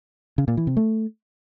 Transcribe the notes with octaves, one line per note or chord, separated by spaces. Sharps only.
C#3
A#2
E3
C3
A3